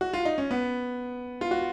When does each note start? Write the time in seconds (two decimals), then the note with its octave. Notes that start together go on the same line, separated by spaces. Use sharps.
0.01 F#4
0.14 F4
0.25 D#4
0.38 C#4
0.51 B3
1.41 F4
1.51 F#4